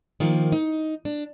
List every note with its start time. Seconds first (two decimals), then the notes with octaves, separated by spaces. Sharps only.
0.20 D#3 F3 A#3
0.52 D#4
1.05 D4